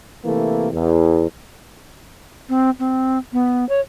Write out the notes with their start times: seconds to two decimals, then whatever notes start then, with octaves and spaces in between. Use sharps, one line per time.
0.25 C3 E3 A3 A#3
0.73 E2
2.49 C4
2.79 C4
3.33 B3
3.69 C#5